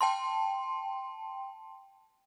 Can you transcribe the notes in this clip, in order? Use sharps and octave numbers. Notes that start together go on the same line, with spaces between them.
G5 A5 C6